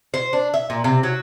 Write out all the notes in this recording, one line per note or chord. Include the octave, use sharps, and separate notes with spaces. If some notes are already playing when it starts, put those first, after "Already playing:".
C5
D4
E5
A#2
C3
F#3